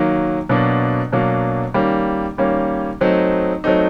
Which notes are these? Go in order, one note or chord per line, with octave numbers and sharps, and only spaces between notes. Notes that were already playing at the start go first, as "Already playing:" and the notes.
Already playing: D#3 F#3 A#3
B2 F#3 A#3 D4
B2 F#3 A#3 D4
D#3 G3 A#3 C#4
D#3 G3 A#3 C#4
F#3 A3 C4 D#4
F#3 A3 C4 D#4